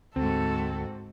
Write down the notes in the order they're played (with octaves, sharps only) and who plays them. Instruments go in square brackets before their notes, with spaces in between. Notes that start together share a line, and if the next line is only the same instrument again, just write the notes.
[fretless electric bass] D2 [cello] G#2 F#4 [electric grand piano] C4 [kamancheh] A4